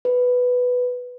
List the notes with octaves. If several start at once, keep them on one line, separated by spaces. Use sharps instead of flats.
B4